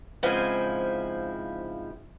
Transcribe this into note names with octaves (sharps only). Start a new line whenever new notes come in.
G#2 C#3 F3 C4 E4 G#5